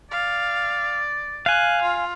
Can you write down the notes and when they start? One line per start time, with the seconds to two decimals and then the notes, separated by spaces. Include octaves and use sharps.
0.11 D5 F5
1.46 F5 G#5 F#6
1.82 F4